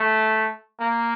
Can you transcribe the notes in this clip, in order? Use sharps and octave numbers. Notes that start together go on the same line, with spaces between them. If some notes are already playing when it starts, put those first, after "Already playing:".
Already playing: A3
A#3